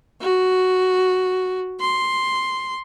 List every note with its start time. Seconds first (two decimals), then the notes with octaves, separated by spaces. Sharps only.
0.21 F#4
1.81 C6